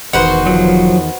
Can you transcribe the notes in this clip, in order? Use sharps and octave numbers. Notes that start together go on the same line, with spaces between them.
E1 E2 D#3 F#4 B4 C5
F3 F#3